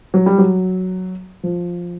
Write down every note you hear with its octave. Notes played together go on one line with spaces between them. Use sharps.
F#3
G3
F#3
F3